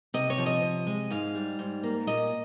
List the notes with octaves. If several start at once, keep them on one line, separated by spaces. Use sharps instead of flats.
C3 D#5
C#5
F3
D#5
C3
G#3
G#2 F5
G3
G#2
A#3
A#2 D#5